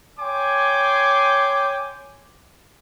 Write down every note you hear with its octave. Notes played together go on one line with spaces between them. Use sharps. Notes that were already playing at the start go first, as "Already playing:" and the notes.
C#5 G5 G#5 C6 D6